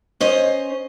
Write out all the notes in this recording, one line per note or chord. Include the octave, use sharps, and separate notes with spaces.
C#4 C5 D#5